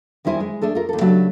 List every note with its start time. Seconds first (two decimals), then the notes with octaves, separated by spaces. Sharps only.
0.25 E2 D#3 G3 E4 C5 G#5
0.40 G#3
0.62 A3 D4 G#4 A4
0.75 F4 A#4
0.89 D#2 A4
1.01 C#3 F#3 A3 D4 F#4 G4